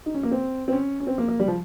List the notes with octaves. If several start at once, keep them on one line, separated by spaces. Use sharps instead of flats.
D#4
C#4
A#3
C4
C4
C#4
C#4
C4
A#3
A#3
G3
F3